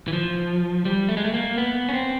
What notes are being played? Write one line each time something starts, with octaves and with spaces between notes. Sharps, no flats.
E3
F3
G3
A3
G#3
A3
A#3
B3
C#4
C4